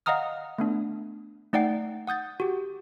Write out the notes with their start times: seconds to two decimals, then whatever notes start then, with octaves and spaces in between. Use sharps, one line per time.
0.06 D#5 F5 F#5 A#5 D#6 F6
0.58 A3 B3 D4
1.53 A3 D#4 D5 F#5 G5 C7
2.07 F#5 D#6 G6 A6
2.40 F#4 G4